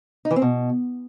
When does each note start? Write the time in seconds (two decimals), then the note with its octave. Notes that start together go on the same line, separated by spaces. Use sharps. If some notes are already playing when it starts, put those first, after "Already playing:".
0.25 D#4
0.31 E3
0.36 C4
0.42 B2